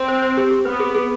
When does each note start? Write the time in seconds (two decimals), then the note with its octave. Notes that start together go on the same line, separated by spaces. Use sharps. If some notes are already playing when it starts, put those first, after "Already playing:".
Already playing: C4
0.08 C5
0.22 C5
0.37 G4
0.51 G4
0.65 B3 B4
0.80 G#4
0.95 G#4